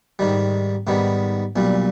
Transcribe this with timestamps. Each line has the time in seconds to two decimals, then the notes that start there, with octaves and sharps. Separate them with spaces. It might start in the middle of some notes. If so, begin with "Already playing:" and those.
0.19 G#2 D#3 G3
0.87 G#2 D#3 G3 B3
1.56 B1 A#2 G3